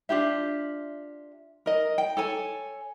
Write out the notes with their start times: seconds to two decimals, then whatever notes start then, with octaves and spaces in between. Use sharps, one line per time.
0.09 D4 F4 G4 E5
1.66 A#4 D#5
1.98 G5
2.17 A4 C#5 G#5